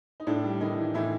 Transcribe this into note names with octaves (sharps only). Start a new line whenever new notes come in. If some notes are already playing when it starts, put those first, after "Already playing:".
D#4
A2 D4
G3
A2 D#3 D#4
E3
A2 E3 E4